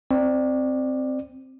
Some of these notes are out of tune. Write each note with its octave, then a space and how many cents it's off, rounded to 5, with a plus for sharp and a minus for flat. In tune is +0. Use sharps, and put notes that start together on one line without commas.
C4 +0 D5 +20